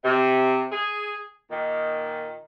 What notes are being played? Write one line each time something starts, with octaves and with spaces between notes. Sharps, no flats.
C3
G#4
A#2 D#3